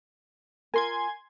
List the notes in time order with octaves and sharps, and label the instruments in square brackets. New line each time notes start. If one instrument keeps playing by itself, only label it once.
[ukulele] F4 A#4 [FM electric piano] G#5 C6 G#6